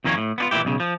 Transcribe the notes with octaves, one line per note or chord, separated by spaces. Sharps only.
F2 D#3 A#3 C#4
A2
B3 D4 F4
A#2 E3 E4 G4
B1 C#3
F3